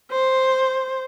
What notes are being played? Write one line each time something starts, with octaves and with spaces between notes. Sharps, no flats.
C5